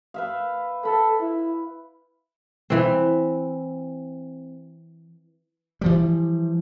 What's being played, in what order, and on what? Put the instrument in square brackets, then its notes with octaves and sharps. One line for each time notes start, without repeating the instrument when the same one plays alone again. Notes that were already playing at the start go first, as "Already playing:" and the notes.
[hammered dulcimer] B4 E5 F5
[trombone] A4 [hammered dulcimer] B5
[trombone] E4
[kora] E3 C4
[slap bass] E3 F3 G3